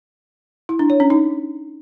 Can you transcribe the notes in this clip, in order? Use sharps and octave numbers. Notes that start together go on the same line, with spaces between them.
E4
D4
C#5
C#4
D#4